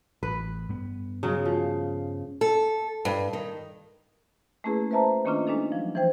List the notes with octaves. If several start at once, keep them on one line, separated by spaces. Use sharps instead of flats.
A1 B4
G2 G3 B3
C#3 F#3 G#3
F3
A4
G2
D#3
A3 A#3 C#4 E4 G#4 B4
B4 C5 E5 A5 A#5
D#3 A#3 C#4 D4 F4
G#3 D4 D#4 A4
F3 F#3
E3 F3 C5 G5